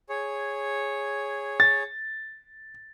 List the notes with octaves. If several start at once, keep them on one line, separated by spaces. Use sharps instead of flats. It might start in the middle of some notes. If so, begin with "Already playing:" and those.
G#4 C#5
A6